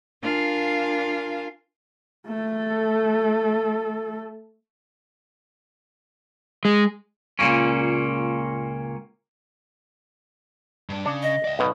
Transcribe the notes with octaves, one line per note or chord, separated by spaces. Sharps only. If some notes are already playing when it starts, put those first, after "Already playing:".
D4 F4 A#4 F5 G#5
A3 A4
G#3
C#2 A#2 C#3 A#3 C#4
G2 D4
C#3 D4
D#5
D5 E5
B1 B2